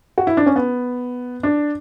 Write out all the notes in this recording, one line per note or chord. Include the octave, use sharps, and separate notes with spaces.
F#4
E4
D4
C#4
B3
D4